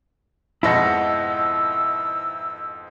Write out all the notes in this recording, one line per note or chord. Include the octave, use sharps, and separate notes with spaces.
F2 G#2 B2 E4 D#5 F#5 E6